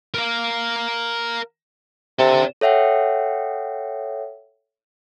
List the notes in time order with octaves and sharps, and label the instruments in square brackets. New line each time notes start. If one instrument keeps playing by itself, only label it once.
[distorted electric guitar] A#4 F5
[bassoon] C3 [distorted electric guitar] D4 A4
[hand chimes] A4 C#5 E5 F#5 G5